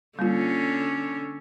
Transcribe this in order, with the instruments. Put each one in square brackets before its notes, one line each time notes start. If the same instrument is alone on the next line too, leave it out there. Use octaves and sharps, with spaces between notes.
[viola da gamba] D3 C#4 [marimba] G3 A#3 F4